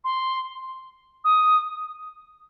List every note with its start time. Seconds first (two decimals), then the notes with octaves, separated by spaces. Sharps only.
0.04 C6
1.24 D#6